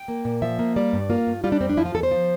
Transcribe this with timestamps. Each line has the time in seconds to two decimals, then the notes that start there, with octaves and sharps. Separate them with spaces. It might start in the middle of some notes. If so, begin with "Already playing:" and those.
Already playing: G5
0.08 A#3
0.25 A#2
0.42 F3 E5
0.59 A#3
0.76 G3 D5
0.93 G2
1.10 A#3 F4
1.27 G2
1.44 G3 F4
1.52 D4
1.61 F2 C4
1.69 D4
1.77 F3 E4
1.86 F4
1.94 E2 A4
2.03 C5
2.11 F3